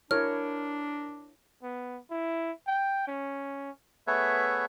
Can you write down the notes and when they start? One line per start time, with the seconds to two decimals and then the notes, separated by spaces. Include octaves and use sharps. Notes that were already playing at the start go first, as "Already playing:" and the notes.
0.11 D4 E4 A#4 C#5 F6
1.63 B3
2.10 E4
2.67 G5
3.08 C#4
4.07 A3 B3 G#4 B4 C#5 E5